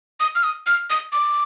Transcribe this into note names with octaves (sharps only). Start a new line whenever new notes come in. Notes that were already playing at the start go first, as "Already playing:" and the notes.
D#6
F6
D#6
F6
D#6
D6